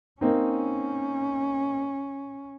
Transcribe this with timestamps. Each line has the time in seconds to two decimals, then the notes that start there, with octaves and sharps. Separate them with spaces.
0.21 A#3 C4 C#4 D#4